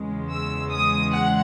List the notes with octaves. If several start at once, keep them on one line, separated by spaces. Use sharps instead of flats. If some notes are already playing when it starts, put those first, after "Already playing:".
Already playing: E2 C#3 G#3
E6
D#6
F#5